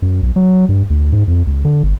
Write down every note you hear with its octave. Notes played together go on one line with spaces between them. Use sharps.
F#2
B1
F#3
G2
D2
G#2
F2
C#2
D3
G1